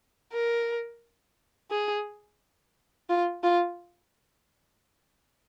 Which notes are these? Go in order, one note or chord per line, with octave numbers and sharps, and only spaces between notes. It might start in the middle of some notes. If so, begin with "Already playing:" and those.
A#4
G#4
F4
F4